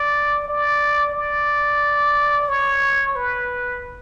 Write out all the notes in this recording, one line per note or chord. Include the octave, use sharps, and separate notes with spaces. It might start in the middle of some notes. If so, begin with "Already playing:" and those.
Already playing: D5
D5
D5
C#5
B4